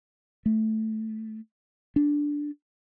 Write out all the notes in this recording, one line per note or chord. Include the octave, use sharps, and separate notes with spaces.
A3
D4